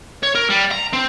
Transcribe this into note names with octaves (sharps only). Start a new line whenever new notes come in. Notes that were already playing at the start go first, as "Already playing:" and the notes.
C#5
A#4
G3
A#5
C4